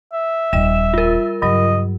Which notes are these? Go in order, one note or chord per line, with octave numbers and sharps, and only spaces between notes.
E5
D#1 F2 G3 D#5 E7
F4 A#4
G2 C#3 F#3 D#5